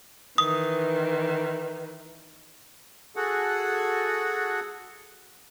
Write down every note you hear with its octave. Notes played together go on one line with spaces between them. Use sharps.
D#3 E3 D#6
F#4 G#4 A4 F#5